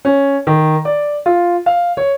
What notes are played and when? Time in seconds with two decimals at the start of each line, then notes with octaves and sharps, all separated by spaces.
0.05 C#4
0.47 D#3
0.85 D5
1.26 F4
1.66 F5
1.97 C#5